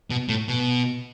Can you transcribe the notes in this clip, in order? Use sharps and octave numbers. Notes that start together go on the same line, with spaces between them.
B2
A2
B2